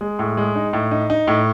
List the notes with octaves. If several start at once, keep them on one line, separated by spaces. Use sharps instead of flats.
G#3
A2
G#3
D#4
A2
D#4
D#4
A2